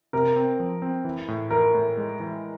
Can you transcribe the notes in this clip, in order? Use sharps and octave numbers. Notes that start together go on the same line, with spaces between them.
C3 A#4
C4
F3
C4
E3
A2
E3 A#4
A2
G#3
E3